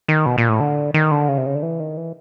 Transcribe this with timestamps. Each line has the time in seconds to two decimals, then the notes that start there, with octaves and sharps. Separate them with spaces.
0.08 D#3
0.26 B2
0.38 A#2
0.49 A2
0.60 D3
0.94 D#3
1.11 D3
1.28 C#3
1.38 C3
1.46 C#3
1.55 D3
1.63 E3
1.80 D#3
1.97 E3